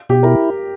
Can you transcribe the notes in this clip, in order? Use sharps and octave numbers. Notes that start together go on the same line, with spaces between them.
B2 G4
E4 A#4